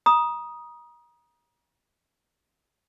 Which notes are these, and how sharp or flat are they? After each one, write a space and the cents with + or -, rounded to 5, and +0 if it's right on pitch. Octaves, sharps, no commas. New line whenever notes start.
A#5 +35 D#6 +0